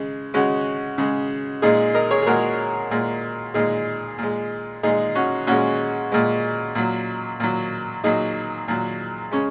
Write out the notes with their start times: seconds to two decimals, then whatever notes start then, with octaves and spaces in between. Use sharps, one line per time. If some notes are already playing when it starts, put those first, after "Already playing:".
Already playing: C#3 G#3
0.34 C#3 G#3 C#4 F#4
0.98 C#3 G#3
1.62 A#2 G#3 D#4 G#4
1.94 A#4 D#5
2.10 G#4 C#5
2.22 G#4
2.26 A#2 G#3 F#4 A#4
2.91 A#2 G#3
3.54 A#2 G#3 D#4 G#4
4.18 A#2 G#3
4.83 A#2 G#3 D#4 G#4
5.15 C#4 F#4
5.47 A#2 G#3 C#4 F#4
6.12 A#2 G#3
6.75 A#2 F#3
7.40 A#2 F#3
8.04 A#2 F#3 D#4 G#4
8.68 A#2 F#3
9.31 C#3 G#3 C#4